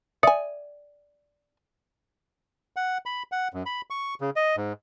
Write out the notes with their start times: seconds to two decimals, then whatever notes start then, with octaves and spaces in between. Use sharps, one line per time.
0.23 D5 E5 G#5 D#6 C#7
2.76 F#5
3.06 B5
3.32 F#5
3.54 F#2
3.66 B5
3.90 C#6
4.21 C#3
4.36 D#5
4.57 G#2